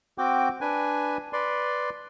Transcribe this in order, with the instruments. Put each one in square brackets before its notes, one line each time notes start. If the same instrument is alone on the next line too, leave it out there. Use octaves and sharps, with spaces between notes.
[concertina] C4 F#4 G5 D6
D4 B4 G#5
B4 D5 C6